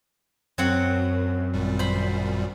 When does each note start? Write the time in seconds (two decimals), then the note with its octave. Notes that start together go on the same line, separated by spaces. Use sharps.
0.58 F#2 F#3 C4 F#5
1.54 G#1 A#2 G3
1.79 C5 B5